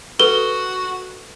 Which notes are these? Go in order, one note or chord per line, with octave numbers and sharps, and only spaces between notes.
F#4 A4 B4 G7